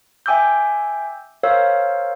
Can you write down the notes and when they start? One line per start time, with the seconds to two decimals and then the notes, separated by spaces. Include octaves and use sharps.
0.26 E5 G5 G#5 D6 E6 G6
1.43 A#4 C5 C#5 F5 E6